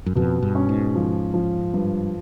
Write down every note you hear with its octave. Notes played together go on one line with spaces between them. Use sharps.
F#2
F2 B2
G2
C#4
G#2
F3
F3
G2